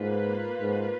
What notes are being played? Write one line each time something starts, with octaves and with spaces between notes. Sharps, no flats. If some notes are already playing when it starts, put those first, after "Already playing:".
Already playing: G#2 A#3 F4 B4
G#2